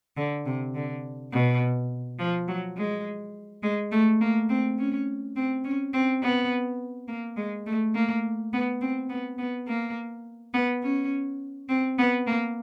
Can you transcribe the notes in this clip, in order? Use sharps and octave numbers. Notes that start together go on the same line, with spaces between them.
D3
C3
D3
B2
F3
F#3
G#3
G#3
A3
A#3
C4
C#4
C4
C#4
C4
B3
A#3
G#3
A3
A#3
B3
C4
B3
B3
A#3
B3
C#4
C4
B3
A#3